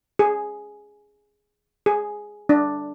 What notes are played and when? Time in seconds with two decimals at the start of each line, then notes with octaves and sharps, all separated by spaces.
0.19 G#4
1.86 G#4
2.49 D4